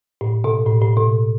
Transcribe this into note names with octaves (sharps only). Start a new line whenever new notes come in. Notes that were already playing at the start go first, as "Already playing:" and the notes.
A2
B2
A2
A2
B2